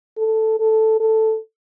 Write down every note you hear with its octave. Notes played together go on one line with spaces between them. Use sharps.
A4
A4
A4